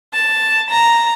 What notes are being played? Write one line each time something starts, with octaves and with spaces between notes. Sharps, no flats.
A5
A#5